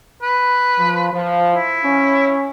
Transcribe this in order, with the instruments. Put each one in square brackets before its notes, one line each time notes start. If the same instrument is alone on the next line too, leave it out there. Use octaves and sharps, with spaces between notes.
[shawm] B4
[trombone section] F3
F3
[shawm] E4
[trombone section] C#4